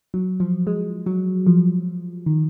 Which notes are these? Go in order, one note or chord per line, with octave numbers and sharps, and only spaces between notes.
F#3
F3
G#3
F#3
F3
D#3